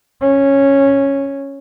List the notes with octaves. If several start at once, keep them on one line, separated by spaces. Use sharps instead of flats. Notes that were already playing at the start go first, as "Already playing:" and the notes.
C#4